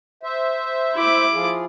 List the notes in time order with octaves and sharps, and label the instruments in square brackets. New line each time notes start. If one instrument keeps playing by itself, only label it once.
[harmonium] C5 E5
[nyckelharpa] E4 D6
[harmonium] F3 F4 G#4